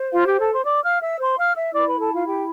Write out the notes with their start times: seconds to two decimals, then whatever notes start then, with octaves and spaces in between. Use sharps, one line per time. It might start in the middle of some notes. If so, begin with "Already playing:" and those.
Already playing: C5
0.12 F4 F5
0.25 G4 G5
0.39 A4 A5
0.52 C5 C6
0.65 D5 D6
0.83 F5 F6
1.01 E5 E6
1.19 C5 C6
1.37 F5 F6
1.55 E5 E6
1.73 E4 B4 D5 D6
1.87 B4 B5
2.00 A4 A5
2.13 F4 F5
2.26 G4 G5